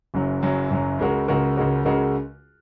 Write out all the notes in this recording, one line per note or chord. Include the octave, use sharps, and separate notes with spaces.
F#1 F#2 F#3
F#1 F#2 F#3
F#1 F#2 F#3
C#2 C#3 G#3 F#4 A#4
C#2 C#3 G#3 F#4 A#4
C#2 C#3 G#3 F#4 A#4
C#2 C#3 G#3 F#4 A#4